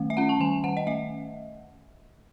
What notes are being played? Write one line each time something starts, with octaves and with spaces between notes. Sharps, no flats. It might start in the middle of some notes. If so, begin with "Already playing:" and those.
Already playing: D#3 A3
E5
C#4 F#5
A5
D#3 G#5
D#3 F#5
D#5
A3 E5